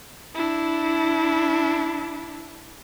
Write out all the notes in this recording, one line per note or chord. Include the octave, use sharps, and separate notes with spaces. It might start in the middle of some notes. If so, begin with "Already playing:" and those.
D4 E4